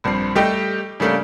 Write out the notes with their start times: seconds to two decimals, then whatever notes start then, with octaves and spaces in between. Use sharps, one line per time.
0.04 A#1 G2 C4 C7
0.35 G3 A3 G4 D#5 G5
1.00 C#3 G3 A3 A#3 D4